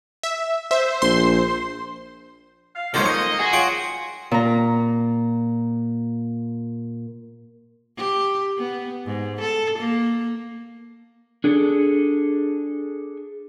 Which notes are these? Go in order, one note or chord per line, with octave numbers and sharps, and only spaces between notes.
E5
C5 E5
A#1 C6
F5
F2 G#2 B2 A#3 D#4 A4 C5 C#5
D#5 C#6
F#4 G#4
F4 C#5 G5
A#2 A#5
G4
B3
G#2
A4
A#3
D4 G#4 A4